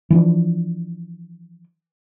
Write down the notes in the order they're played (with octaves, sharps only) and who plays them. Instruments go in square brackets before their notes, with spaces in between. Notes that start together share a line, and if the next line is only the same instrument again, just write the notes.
[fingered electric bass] E3 F3 D4